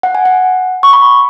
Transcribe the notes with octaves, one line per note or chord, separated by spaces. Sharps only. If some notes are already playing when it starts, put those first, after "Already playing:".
F#5
G#5
F#5
C#6
B5